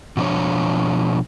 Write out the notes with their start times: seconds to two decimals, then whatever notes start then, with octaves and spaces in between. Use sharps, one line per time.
0.17 B2 F3 D4 C#5